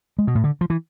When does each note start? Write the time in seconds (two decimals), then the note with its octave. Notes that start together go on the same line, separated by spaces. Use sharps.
0.19 G#3
0.27 B2
0.35 A2
0.44 D3
0.61 F3
0.70 E3